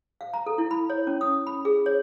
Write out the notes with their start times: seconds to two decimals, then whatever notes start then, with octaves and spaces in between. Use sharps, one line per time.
0.21 F5
0.33 A#5
0.46 A4
0.58 E4
0.71 B5
0.90 C#5
1.07 C#4
1.21 D#6
1.47 B5
1.65 G#4
1.86 C#5